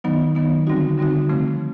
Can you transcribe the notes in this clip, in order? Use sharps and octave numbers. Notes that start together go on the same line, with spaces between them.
D#3 F#3 B3 D#4
D#3 F#3 B3 D#4
D3 G3 C4 D#4 F#4
D3 G3 C4 D#4 F#4
C#3 F3 A3 C4